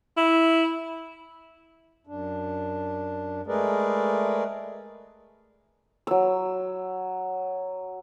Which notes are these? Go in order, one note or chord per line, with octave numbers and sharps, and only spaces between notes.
E4
F#2 D4
G#3 A3 G#4 A#4 B4 D5
F#3 E6